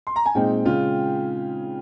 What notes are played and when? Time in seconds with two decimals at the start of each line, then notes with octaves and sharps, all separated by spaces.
0.07 C6
0.16 A#5
0.26 G#5
0.35 A#2 G#3 C4 D#4 G5
0.65 C#3 G#3 C#4 F4